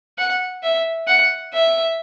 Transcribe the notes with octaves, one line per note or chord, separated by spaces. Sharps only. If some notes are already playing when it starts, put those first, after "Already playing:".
F#5
E5
F#5
E5